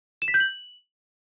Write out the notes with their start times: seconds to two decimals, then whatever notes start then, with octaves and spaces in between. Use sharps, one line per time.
0.22 E7
0.28 B6
0.34 G6
0.40 F#7